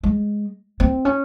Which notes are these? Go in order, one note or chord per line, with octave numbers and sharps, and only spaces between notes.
G#3
C4
C#4